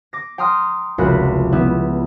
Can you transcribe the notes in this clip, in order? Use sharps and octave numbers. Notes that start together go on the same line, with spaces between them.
D6 A#6
G5 A#5 C6 D#6 F6
F1 C#2 F#4 A#4 B5
G3 B3 E4